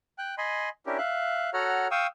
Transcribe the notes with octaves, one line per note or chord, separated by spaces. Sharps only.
G5 F#6
D#5 G#5 B5 C6
C#4 D4 E4 G4 A#4
E5 F5 F#6
F#4 A4 C#5 F#5 A#5 F6
F5 G5 C#6 D#6 E6